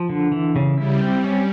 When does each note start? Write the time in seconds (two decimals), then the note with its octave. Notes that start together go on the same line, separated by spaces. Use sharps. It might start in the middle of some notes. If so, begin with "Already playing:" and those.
Already playing: F3
0.09 D3
0.32 E3
0.56 C#3
0.78 G3 E4
1.01 C4
1.24 C#4